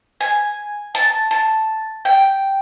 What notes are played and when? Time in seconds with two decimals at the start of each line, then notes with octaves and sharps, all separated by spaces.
0.21 G#5
0.95 A5
1.31 A5
2.05 G5